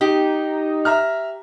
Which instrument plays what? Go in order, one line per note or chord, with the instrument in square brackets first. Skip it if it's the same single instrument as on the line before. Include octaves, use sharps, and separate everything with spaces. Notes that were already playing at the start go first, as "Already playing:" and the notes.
[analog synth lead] D#4 [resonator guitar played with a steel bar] G4
[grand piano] E5 A#5 F6